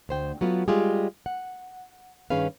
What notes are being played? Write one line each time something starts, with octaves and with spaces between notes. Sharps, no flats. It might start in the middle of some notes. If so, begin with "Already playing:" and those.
D2 C5 G5
F#3 A3 B3 F4
G3 G#3 F4 G4 G#4
F#5
G2 D#3 C#4 G#4 B4 F5